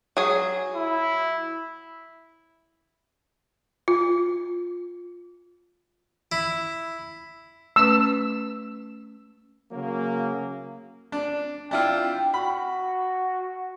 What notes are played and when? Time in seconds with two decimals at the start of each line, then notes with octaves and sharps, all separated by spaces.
0.17 F#3 G#4
0.76 E4
3.88 F4
6.32 E4
7.76 A3 C#4 B4 E6
9.72 C#3 F#3 A#3
11.12 D4
11.71 D4 E4 F4 G5
12.34 F#4 B5